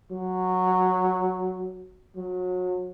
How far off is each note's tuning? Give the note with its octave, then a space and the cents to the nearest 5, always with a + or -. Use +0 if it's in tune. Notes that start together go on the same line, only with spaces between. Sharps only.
F#3 -5
F#3 -30